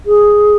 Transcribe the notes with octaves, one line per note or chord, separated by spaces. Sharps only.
G#4